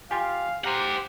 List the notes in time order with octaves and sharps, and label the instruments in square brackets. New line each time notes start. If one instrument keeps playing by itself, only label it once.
[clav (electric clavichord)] F4 G4 [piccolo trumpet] F5 [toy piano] G#5 D6
[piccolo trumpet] G4 [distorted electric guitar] C5 F#5 [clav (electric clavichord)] F5 A#5